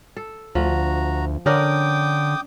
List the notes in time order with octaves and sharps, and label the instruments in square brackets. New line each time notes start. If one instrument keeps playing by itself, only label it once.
[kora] A4
[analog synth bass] D2 [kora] F3 [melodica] F#4 A#5
[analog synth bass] D3 [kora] C#4 D4 A#4 [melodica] G5 D6 D#6